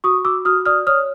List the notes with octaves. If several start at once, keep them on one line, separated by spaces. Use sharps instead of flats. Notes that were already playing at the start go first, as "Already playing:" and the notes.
F#4 C#6 D#6
F#4 D6 E6
F#4 D#6 F6
D5 D#6 F6
C#5 D#6 F6